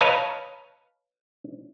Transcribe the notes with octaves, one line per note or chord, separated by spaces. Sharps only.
B4 C#5 D#5 F5 A5 A#5